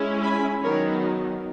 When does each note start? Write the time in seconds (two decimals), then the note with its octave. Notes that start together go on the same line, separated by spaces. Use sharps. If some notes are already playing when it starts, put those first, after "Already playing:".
Already playing: G#3 C#4 E4
0.23 G#5 B5
0.62 D#3 F#3 B3 D#4 A#4 C#5